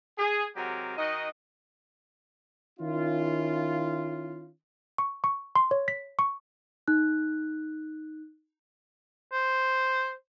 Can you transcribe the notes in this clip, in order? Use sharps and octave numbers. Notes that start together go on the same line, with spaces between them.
G#4
C3 F#3 G#3 F#4 G4 A#4
D#3 D#4 F#4 D#5
D#3 C#4 E4 F4
C#6
C#6
C6
C#5
B6
C#6
D#4 F#6
C5